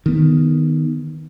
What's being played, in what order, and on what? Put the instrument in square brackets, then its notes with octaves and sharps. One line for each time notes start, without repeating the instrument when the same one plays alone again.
[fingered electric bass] D#3 B3